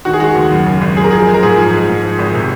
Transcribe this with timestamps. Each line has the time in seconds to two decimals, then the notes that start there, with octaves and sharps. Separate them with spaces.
0.05 D#3 F#4
0.13 G#4
0.20 G#3 F#4
0.36 D#2
0.51 F#2
0.66 C#3
0.81 G#1
0.97 F#2 G#4
1.04 A#4
1.11 F3 G#4
1.27 G#3
1.34 A#4
1.43 G#2 G#4
1.57 F3
1.73 G#3
1.88 G#2
2.03 F3
2.19 G#1
2.34 C3